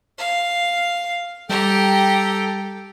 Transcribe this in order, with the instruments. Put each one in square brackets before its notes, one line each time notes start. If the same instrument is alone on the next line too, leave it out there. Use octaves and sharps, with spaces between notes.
[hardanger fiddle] F5
[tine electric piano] G3 [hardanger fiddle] G4 A#5 [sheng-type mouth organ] A4 G5